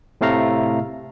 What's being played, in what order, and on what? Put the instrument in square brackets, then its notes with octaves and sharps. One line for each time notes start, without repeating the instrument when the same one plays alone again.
[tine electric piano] A2 C3 A3 F5 A#5